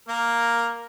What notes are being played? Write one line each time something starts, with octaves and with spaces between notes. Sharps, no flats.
A#3 A#4